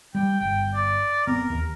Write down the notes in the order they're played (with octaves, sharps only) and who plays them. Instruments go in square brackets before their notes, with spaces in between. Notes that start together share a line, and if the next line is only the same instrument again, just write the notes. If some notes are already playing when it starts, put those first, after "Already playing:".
[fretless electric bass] G3 [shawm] G5
[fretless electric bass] G1 [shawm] G5
[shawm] D5
[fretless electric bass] F#1 B3 C4 [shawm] A#4
[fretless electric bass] D#2